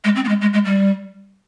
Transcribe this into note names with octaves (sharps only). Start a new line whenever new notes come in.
G#3
C4
B3
G#3
G#3
G#3
G3